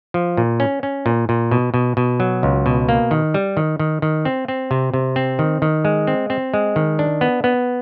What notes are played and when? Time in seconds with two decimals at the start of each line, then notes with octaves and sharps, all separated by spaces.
0.14 F3
0.37 A#2
0.60 C#4
0.83 C#4
1.06 A#2
1.29 A#2
1.51 B2
1.74 B2
1.97 B2
2.20 F#3
2.43 C#2
2.66 B2
2.89 A#3
3.11 D#3
3.34 G3
3.57 D#3
3.79 D#3
4.02 D#3
4.25 C4
4.48 C4
4.71 C3
4.94 C3
5.16 C4
5.39 D#3
5.62 D#3
5.85 G#3
6.07 C4
6.30 C4
6.54 G#3
6.76 D#3
6.99 D4
7.21 B3
7.44 B3